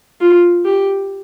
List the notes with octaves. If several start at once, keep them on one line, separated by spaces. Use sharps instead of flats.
F4
G4